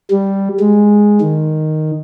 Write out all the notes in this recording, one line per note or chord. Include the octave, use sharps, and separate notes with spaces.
G3
G#3
D#3